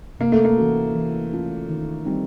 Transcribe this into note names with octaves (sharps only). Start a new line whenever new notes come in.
C3 A#3
A3
A#3
E3 A3 C#4 F#4
E3
A3 C#4 F4 A4
D#3
G3 C4 D#4